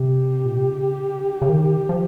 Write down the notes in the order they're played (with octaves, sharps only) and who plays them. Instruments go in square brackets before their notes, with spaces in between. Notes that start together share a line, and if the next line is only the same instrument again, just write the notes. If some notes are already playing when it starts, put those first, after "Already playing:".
Already playing: [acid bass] C3 [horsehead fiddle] G4
[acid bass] A#2
C3
C#3
C#3
D#3
F3